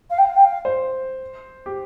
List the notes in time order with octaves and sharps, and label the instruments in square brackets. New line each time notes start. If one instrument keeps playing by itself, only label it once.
[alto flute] F5
G5
F5
G5
F5
[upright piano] C5
G4